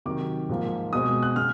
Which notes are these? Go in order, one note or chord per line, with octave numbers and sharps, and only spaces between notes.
C3 D#3 F#3 D6
G#2 F3 A#3
B2 G#3 C4 D#6
F#6
C#3 F6